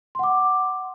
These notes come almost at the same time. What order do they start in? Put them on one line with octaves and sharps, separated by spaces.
C6 F#5 D6